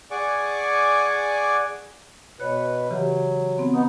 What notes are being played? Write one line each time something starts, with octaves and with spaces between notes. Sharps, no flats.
G#4 D5 F#5 G#5 C#6 D6
B2 B4 C#5 F#6
C#3 E3 F#3 G4
B3 C4
B3 D#4 D#6